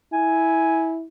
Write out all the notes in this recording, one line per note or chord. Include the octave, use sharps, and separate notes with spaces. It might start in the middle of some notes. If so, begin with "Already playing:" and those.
E4 G#5